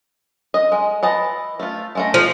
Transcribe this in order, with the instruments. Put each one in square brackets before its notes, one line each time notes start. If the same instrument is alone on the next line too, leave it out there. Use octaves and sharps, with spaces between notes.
[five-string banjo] D#5
G#3
E3 D#5 A5
A3 F4
G#3 A3 A#5
[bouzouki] F3 [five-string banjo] A3